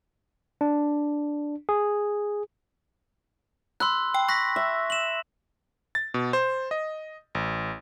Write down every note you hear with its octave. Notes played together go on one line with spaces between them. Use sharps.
D4
G#4
B5 C6 E6 F#6
G5
C#6 F#6 A#6 B6
E5
E7 F#7
A6
B2
C5
D#5
A1